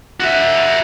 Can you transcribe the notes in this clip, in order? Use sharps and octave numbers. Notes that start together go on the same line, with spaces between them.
F#4 E5